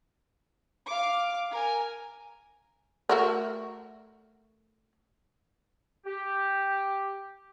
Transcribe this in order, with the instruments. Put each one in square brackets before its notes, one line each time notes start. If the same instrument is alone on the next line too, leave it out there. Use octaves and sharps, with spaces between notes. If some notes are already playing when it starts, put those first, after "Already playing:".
[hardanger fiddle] F5 D6
A#4 G#5
[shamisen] A3 F#4 A#4
[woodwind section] G4